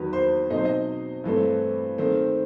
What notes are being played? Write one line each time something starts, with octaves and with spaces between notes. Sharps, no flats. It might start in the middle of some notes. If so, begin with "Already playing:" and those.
Already playing: E2 D#3 F#3 B4
C5
B2 F#3 C4 D#4 D#5
C5
D#5
G2 E3 A3 C4
D#3 A3 C4